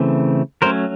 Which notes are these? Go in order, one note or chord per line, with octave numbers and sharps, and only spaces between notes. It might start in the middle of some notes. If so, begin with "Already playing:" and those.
Already playing: C#3 E3 A3 C4
F#3 A3 C#4 A#4 C5